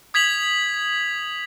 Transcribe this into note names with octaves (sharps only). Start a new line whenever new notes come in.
D#6 G#6 B6 F7 F#7